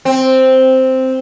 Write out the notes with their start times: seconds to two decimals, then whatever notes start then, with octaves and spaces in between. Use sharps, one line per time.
0.05 C4